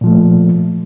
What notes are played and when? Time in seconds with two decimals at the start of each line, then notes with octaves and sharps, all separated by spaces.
0.01 A#2
0.04 F3
0.07 A3